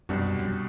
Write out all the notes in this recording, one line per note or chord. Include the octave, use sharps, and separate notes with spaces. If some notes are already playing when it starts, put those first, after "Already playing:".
C2 F#2 B2 G3 D4 F#4
F#2